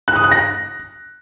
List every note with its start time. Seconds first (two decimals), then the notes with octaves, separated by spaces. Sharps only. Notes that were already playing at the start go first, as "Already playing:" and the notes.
0.08 F#6
0.16 D#6
0.24 F#6
0.32 A#6